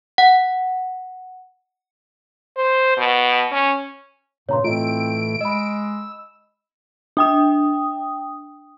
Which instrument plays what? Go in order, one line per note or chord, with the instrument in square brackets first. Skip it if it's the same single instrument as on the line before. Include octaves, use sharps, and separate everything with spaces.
[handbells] F#5
[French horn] C5
B2
C#4
[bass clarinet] G2 [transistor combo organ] A#2 C#3 [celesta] C#5 A#5 C6
[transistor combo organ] A2 E3 A3 [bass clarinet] C4 [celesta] F4 D#5 [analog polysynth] D7
[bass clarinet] G#3 [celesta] D#5 B5 [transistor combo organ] E6
[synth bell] D4 G5 D#6